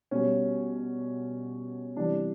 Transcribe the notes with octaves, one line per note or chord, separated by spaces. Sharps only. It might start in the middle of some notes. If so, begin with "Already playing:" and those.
B2 G3 C#4
C3 E3 G3 D4